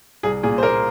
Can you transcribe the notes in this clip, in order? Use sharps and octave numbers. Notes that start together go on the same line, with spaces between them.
C2 G#4
A#2 G#4
C5
A#3 A#4